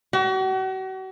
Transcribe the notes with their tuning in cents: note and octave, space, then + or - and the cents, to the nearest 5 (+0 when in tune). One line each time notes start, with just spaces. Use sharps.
F#4 +40